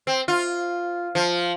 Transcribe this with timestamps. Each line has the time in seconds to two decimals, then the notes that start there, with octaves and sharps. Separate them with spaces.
0.07 C4
0.28 F4
1.15 F3